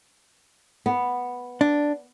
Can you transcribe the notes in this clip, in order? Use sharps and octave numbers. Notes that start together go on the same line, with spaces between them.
B3
D4